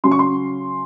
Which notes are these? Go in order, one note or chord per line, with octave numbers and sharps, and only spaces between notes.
C#3 F#3 C#4 C6
C#6
C6